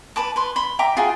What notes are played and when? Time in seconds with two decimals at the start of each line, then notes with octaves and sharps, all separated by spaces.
0.16 B4 A5 D6
0.36 B4 C6
0.56 B5 C6
0.79 E5 G5 A#5 D6
0.97 F4 F#4 G#4 G5